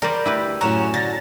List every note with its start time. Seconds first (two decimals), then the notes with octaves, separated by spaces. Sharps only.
0.02 G3 A#4 C5 D5
0.26 D2 E4 G4 B4
0.61 F#2 A2 F#3 C#4 F#4 A#5 E7
0.94 D3 A6 A#6